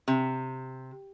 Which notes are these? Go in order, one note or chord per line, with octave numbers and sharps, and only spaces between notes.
C3